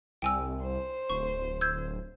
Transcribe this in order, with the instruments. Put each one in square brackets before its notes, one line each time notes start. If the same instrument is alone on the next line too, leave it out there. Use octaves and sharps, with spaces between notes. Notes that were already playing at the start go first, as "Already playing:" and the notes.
[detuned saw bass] C2 [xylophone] G5 G#5 E6
[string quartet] C5
[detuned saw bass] D1 [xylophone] C#6
[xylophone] E6 G6 G#6